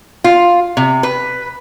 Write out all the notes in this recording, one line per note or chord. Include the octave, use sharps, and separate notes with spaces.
F4
C3
B4